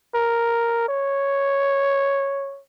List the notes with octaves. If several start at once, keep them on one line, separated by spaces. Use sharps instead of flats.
A#4
C#5